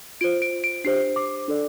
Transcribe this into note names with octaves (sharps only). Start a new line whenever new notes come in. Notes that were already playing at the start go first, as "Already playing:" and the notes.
F4 C5 D7
D7
D7
D4 G4 C5 C7
D6
D4 A4 D5